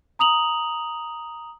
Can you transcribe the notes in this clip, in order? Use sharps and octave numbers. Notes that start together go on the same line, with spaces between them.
A#5 D#6 F7 F#7